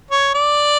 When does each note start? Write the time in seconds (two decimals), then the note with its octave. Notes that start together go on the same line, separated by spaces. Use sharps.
0.11 C#5
0.34 D5